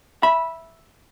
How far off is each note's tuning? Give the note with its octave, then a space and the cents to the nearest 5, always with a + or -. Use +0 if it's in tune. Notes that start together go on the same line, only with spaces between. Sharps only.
E5 +0 B5 -15